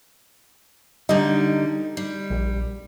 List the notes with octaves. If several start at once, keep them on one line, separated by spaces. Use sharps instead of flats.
D3 G3 D#4
G3
A#1